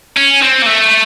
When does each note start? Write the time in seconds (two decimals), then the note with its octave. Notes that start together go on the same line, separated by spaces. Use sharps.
0.17 C#4
0.42 C4
0.62 A#3
0.66 A3